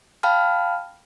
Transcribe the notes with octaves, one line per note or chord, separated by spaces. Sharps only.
F5 G5 A5 B5 F6